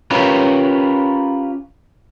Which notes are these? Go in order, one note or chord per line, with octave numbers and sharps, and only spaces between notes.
C#4 F4 G4 A#4 B4